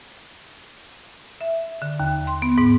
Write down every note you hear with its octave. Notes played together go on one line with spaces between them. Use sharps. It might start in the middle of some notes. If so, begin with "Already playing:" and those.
E5
D3
D#2
C6
B3
G#2